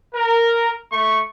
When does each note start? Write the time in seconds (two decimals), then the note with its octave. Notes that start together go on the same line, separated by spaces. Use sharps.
0.15 A#4
0.92 A3 C#6